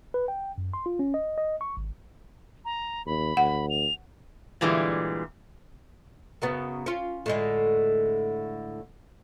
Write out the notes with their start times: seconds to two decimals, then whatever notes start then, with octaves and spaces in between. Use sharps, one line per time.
0.14 B4
0.28 G5
0.58 F#2
0.73 C6
0.86 F4
0.99 C#4
1.14 D#5
1.38 D#5
1.61 C#6
1.77 G#1
2.65 A#5
3.06 D#2 B5
3.37 D2 F#5
3.70 F7
4.61 A#2 D3 E3 G3 G#3
6.42 F#2 C#3 B3
6.86 C#4 F4
7.26 A2 D3 G#3